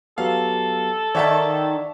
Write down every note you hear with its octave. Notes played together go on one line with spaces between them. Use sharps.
F#3 B3 G4 A4 F5
D#3 C#5 D5 E5 F#5 A5